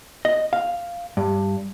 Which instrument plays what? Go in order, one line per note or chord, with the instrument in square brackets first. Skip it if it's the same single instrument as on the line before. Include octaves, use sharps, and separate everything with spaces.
[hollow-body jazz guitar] D#5
F5
G2